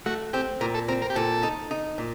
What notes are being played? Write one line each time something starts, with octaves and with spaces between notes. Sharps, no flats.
A3 F#4
C4 G4
A#2 A#4
A4
C4 A#4
A#4
G4
A#2 A4
D#4
D#4
A#2